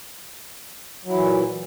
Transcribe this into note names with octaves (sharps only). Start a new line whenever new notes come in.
A#2 E3 F#3 E4